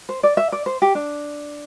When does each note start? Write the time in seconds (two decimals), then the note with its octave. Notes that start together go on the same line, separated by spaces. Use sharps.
0.09 C5
0.23 D5
0.37 E5
0.52 D5
0.66 C5
0.82 G4
0.95 D4